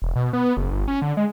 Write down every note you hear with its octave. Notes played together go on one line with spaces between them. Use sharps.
E1
B2
B3
F#1
G1
C#4
D3
G#3